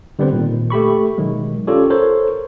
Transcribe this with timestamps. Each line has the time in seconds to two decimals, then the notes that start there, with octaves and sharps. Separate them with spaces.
0.19 D3 G3 B3 C4 B4 C5
0.33 A#2 D#3
0.70 A3 G4 B5 C#6
1.18 B2 D#3 F#3 G#3
1.67 C#4 F4 G4 A4 C#5 D5
1.90 A4 A#4 C5 C#5